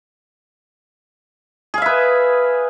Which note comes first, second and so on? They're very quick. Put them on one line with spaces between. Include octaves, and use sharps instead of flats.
G#4 F5 E5 B4